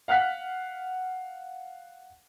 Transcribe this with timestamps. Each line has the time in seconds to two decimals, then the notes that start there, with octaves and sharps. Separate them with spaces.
0.08 F5 F#5 F6 F#6 B6